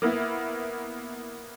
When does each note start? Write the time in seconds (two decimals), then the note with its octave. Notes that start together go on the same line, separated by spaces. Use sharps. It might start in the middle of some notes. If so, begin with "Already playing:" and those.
0.02 A#3 B3 E4